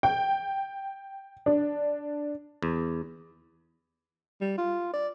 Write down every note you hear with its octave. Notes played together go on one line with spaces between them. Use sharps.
G5
D4
E2
G3
F4
D5